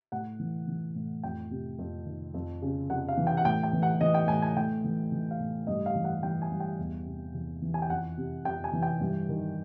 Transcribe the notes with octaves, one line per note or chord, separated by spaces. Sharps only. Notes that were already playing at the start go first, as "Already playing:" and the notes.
A2 F#5
E3
E3
A2
F2 G5
C3
F2
D#3
F2
C#3
F2 F#5
F5
E3
G5
F#5
A2 G5
G5
E3
F#5
E3 D#5
G5
A2 G#5
G#5
A2 G5
E3
E3
F5
A2
G2 D#5
F5
E3
F#5
E3 G5
G#5
G2
G5
E2
C3
E2
E3
G#5
G5
F2 F#5
C3
F2 G5
G#5
E3
G5
G2
D#3